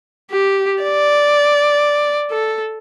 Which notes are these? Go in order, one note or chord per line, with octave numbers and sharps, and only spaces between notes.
G4
D5
A4